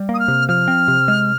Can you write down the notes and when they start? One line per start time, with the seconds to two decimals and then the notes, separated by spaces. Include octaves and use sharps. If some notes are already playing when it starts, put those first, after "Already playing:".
Already playing: G3
0.09 A#3 D#6
0.19 F6
0.28 C3
0.48 F3 F6
0.68 C4
0.88 C3
1.08 G#3